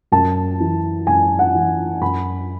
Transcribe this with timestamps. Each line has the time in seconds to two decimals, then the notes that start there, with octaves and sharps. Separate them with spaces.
0.12 F#2 A5
0.60 E3
1.07 F#2 G#5
1.39 F#5
1.55 E3
2.01 F#2 B5